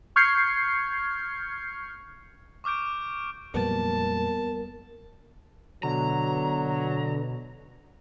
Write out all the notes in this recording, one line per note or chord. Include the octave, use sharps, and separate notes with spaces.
C#6 F6 G6 G#6 C7 C#7
C#6 D6 F6 G6 D7
F2 A#2 F#3 G3 B3 A#4 A5
B2 D3 F#3 A#5